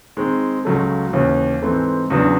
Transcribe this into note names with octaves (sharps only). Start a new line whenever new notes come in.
D#3 G#3 C4
C#2 C#3 F#3 A3
D#2 C#3 E3
G#2 E3 A3 C4
E2 C#3 F#3 B3 D4